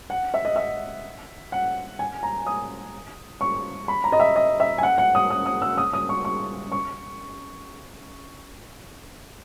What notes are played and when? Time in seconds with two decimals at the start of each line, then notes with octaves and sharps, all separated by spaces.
0.10 F#5
0.34 E5
0.45 D#5
0.56 E5
1.52 F#5
1.99 G#5
2.23 A#5
2.47 D#6
3.41 C#6
3.88 B5
4.04 A#5
4.12 D#5
4.20 E5
4.36 D#5
4.60 E5
4.78 G#5
4.83 F#5
4.98 F#5
5.15 D#6
5.30 D#6
5.46 D#6
5.62 E6
5.78 D#6
5.93 D#6
6.09 C#6
6.25 C#6
6.72 C#6